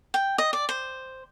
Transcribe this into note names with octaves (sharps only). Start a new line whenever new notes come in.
G5
D#5
D5
C5